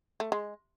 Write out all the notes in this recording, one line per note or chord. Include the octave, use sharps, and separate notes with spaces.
A3
G#3